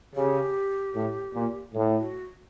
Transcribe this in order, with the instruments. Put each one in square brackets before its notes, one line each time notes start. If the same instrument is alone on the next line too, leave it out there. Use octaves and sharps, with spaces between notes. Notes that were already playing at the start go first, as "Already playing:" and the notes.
[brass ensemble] C#3 [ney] G4
[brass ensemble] A2
A#2
A2
[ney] F#4